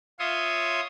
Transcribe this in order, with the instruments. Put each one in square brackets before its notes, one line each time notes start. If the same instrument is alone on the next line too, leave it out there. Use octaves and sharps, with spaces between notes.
[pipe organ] F4 C#5 E5 C6 D#6